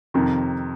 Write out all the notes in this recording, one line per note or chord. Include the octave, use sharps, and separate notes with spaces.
F2 C3 D#3